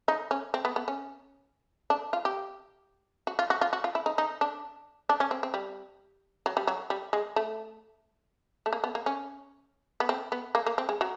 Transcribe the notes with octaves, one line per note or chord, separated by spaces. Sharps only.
D#4
C#4
C4
B3
B3
C#4
D4
F4
G4
F#4
F4
F#4
F4
F#4
F4
E4
D#4
D#4
D4
D4
C#4
C4
C4
G3
F#3
G3
F#3
G3
G#3
A3
A3
A#3
B3
A#3
C#4
B3
C4
B3
A#3
A#3
C4
G#3
F#3